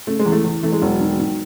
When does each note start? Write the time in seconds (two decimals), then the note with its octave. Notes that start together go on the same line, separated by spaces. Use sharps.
0.07 C#3 A3
0.19 G#3
0.25 E2
0.32 A3
0.44 E2
0.63 E3 A3
0.72 G#3
0.82 E1 F#3
1.00 D#3
1.19 D#3